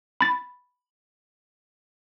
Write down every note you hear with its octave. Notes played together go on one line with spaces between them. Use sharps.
B5 A6